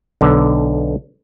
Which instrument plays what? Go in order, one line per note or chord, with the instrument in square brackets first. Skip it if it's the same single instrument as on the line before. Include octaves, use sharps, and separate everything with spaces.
[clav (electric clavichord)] B1 D3